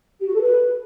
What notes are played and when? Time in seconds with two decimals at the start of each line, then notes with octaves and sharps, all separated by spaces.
0.21 G4
0.27 F#4
0.34 A4
0.41 B4